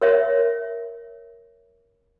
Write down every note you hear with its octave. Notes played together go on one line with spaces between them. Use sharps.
A#4 C#5 E5